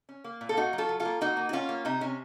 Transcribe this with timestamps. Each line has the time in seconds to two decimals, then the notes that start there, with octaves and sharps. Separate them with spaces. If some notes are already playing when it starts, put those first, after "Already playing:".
0.09 C#4
0.24 A#3
0.41 A#2
0.49 A4
0.57 A#3 D#4 F#4
0.73 F#3
0.78 F4 A4
0.89 F#3
1.00 F4 A4
1.05 A#3
1.21 A#3 D#4 F#4
1.37 A#3
1.49 F#4
1.53 A#3 C#4 F4
1.69 A#3
1.85 C3 D#4
2.01 C3 C#4